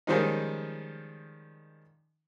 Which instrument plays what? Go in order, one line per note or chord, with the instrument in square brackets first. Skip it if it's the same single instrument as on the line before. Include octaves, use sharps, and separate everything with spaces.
[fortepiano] D#3 F3 G3 G#3 C#4 D#4